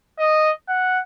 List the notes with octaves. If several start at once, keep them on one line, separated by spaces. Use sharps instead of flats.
D#5
F#5